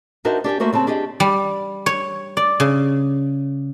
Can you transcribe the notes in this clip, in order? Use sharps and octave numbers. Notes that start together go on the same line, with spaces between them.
D4 D#4 F#4 A#4 C5 E5
D4 G4 D5 G#5
A3 A#3 F#4 C5 E5
C#3 C4 D5 A5
D4 G4 G#4 D#5
G3
C#5
D5
C#3